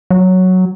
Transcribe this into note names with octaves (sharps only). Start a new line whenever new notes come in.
F#3